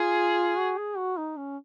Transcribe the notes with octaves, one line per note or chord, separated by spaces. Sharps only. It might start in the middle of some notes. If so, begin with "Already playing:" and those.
Already playing: F4 G#4
F#4
G#4
F#4
D#4
C#4